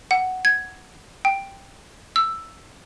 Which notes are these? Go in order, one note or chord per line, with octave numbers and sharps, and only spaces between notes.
F#5
G#6
G5
E6